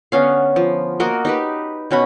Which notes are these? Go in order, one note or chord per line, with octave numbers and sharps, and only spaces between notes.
D3 B3 C#4 F5
F3
A#3 F#4 A#4 D#5
D#4 G4 B4
B2 C#4 F#4 B5